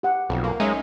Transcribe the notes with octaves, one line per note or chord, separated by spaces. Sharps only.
G4 F#5
B1 F2
A#3
G#3 C#4 D#4 E5